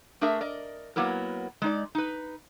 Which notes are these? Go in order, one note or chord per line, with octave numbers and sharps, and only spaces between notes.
A3 D4 G#4 A#4 E5
A#4 D5 D#5
F#3 A#3 B3 E4 A#4
G#3 D#4 D5
D#4 B4